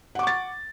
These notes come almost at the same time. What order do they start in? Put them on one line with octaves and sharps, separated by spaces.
F#5 D6 C#6 A6